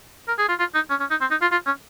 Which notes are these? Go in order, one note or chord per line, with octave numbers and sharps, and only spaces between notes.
A#4
G#4
F4
F4
D#4
C#4
C#4
D#4
C4
D#4
F4
F4
C#4